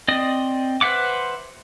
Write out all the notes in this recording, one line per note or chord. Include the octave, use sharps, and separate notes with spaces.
C4 D5 D#5 D#6
B4 C5 E5 F#5 D6